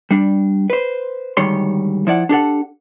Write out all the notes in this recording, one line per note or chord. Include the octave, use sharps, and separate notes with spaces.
G3 D4
B4 C5
D2 G#2 D#3 G3 C#5 C6
F3 E4 D5 F#5
D4 G4 A4 F#5